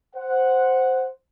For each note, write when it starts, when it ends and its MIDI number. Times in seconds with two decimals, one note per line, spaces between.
0.15 1.08 72
0.15 1.08 78